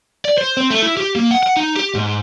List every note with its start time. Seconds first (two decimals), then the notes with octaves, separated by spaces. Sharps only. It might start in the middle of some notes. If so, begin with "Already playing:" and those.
0.25 D5
0.38 C5
0.57 C4
0.71 A3
0.83 E4
0.97 G4
1.16 A#3
1.31 F#5
1.43 F#5
1.57 D#4
1.76 G4
1.95 G#2